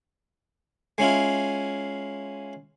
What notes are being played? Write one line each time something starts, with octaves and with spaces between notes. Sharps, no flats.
G#3 C#4 E4 F4